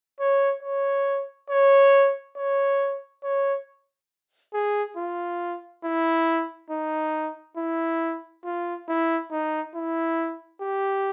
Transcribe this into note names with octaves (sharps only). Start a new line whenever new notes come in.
C#5
C#5
C#5
C#5
C#5
G#4
F4
E4
D#4
E4
F4
E4
D#4
E4
G4